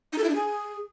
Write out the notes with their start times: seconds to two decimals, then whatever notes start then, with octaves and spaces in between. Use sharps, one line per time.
0.13 D#4
0.18 A4
0.24 E4
0.29 D4
0.35 G#4